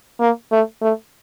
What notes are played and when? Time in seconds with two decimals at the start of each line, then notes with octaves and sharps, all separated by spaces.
0.21 A#3
0.52 A3
0.82 A3